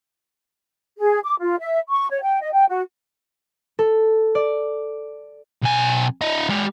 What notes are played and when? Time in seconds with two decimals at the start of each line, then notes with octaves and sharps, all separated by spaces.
0.98 G#4
1.24 D6
1.41 F4
1.60 E5
1.89 C#6
2.10 C#5
2.22 G5
2.41 D#5
2.52 G5
2.69 F#4
3.79 A4
4.35 D5
5.63 B1 G#5
6.21 E4 D#5
6.49 G#3 G4